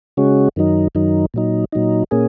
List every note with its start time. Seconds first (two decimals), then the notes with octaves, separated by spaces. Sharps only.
0.17 C#3 G#3 C#4 F#4
0.56 F#2 D#3 F#3 D#4
0.95 F#2 D#3 F#3 D#4
1.34 A#2 F#3 D#4
1.72 A#2 F#3 D#4
2.11 A#2 A#3 C#4 G#4